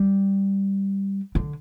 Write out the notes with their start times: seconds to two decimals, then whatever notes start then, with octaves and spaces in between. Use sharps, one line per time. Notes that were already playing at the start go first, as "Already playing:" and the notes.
Already playing: G3
1.35 D3